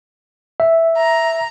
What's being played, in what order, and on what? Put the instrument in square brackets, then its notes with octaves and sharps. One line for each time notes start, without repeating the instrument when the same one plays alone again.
[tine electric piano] E5
[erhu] A#5